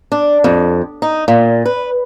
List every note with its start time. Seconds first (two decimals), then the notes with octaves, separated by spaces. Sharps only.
0.12 D4
0.44 F2
1.02 D#4
1.28 A#2
1.65 B4